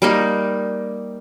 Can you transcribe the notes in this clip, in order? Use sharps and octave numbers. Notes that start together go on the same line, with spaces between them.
G3 A#3 D#4